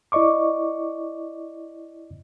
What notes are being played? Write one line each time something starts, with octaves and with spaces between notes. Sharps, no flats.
E4 D5 D#5 C#6 D6